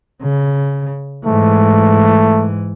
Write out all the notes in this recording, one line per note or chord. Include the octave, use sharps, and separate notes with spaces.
C#3
G#2 E3 A3